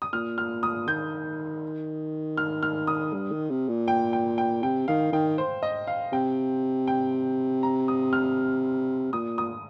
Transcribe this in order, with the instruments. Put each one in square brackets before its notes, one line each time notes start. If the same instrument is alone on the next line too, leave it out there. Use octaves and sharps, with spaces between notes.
[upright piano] D#6
[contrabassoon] A#2 [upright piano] F6
[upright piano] F6
D#6
[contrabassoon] D#3 [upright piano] G6
[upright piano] F6
F6
D#6
[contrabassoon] G2
D#3
C3
A#2
[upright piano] G5
G5
G5
[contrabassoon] C3 [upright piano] G5
[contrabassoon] D#3 [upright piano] F5
[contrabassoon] D#3 [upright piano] G5
[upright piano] C5
D#5
F5
[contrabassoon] C3 [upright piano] G5
[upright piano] G5
A#5
D#6
F6
[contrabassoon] A#2 [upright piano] D#6
[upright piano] D#6